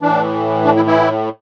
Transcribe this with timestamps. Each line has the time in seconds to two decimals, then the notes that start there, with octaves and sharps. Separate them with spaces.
0.02 A2 E3 D4
0.65 D4
0.76 E3 E4
0.86 E3 E4